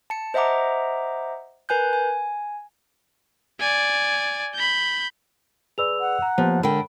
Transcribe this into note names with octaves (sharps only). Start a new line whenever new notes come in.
A5 C#7
C5 D#5 E5 F#5 A#5 D6
A#4 B4 G#5 F#6 G6
G#5
D5 G#5
B5 G6
G#4 B4 D5 E6 F7
F#5
A#5
F3 A#3 B3 G4
D3 G#3 A#4 G5 B5